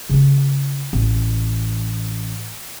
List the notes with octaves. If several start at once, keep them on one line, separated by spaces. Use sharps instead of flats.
C#3 F4
A1